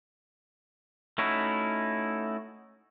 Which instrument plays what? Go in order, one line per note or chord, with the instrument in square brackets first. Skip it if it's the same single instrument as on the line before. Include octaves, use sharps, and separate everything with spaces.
[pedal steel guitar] A3 C#4 D#4 E4 F#4